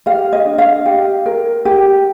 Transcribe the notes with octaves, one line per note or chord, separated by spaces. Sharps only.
G4 F5
D#5
D4
F5
G4
A#4
G4